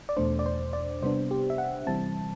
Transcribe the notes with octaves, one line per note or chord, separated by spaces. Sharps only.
D5
E2 B2 A3 D4 C5
D5
C5
D5
C3 G3 B3 D4 C5
G4
E5
F#5
C3 E3 G3 C4 A5